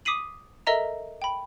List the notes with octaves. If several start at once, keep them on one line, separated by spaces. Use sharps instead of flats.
D6 D#6 B6 C7 D#7 F#7
A4 A#4 D#5 E5 A#5
G5 B5